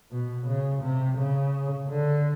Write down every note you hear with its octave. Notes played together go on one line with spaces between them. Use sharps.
B2
C#3
C3
C#3
D3